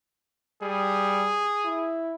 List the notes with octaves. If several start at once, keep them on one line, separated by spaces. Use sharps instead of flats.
G3 G#4
E4